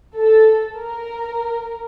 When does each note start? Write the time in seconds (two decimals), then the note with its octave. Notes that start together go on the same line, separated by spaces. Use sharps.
0.15 A4
0.77 A#4